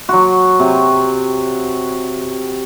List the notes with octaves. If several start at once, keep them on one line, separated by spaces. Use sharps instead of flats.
F#3 F#4
C3